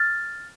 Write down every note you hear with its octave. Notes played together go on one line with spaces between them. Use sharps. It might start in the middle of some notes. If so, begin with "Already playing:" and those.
Already playing: F6 A6